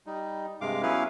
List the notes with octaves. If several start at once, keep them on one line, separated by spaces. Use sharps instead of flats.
G3 D#4
G2 C3 G#3 F5 D6
F#3 B3 C#4 E4 B4 F5